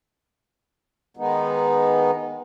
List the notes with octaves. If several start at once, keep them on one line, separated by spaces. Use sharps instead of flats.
D#3 G#3 B3 D#4